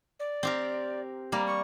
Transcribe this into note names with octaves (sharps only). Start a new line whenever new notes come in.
D5
C4 G4 A#4
G3 A#3 A#5
C#6